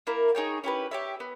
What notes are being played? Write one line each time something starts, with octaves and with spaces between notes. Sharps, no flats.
A#3 E4 A#4
D#4 G#4 C#5 G5
C#4 E4 G4 B4
G4 C#5 E5
B3